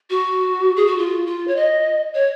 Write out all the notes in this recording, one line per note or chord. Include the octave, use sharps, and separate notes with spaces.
F#4
G#4
F#4
F4
F4
C#5
D#5
C#5